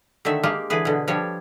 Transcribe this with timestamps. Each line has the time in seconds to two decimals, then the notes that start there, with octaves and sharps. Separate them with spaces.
0.25 D3 D#3 A3 E5
0.44 G#3 A#3 F4 G4
0.70 D3 E3 G#4 B4
0.85 B2 D3
1.08 F3 G3 D4 C#5